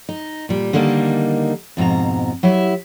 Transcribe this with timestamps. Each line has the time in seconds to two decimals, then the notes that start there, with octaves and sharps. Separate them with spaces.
0.09 D#4
0.49 A#2 G3
0.73 D3 D#3 G3 A#3 D4 D#4
1.77 F2 G#2 B2 A#5
2.43 F#3 E4 G4 E5